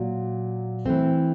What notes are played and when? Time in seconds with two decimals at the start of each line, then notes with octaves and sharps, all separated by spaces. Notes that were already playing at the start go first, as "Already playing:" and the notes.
Already playing: A#2 F#3
0.86 E3 A3 C4